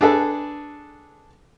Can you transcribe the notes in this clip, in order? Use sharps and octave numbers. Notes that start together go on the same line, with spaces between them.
D4 G#4 A4 B4